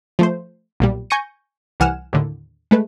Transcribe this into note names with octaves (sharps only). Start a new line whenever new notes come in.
F3 A3 C5
B1 A#2 G3
G#5 C#6 G6 A#6 C#7 D#7
C2 E3 F#5 G#5 F6 E7
D#2 A2 D3
G#3 A3 B4